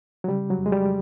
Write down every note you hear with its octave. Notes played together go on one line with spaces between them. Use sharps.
F#3
C#3 G3
F#3
F2
G#3
G3